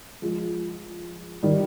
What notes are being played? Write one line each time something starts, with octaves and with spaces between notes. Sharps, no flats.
F3 G#3
D#3 G3